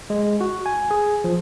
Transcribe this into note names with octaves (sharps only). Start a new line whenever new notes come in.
G#3
F#4
G#5
G#4
F3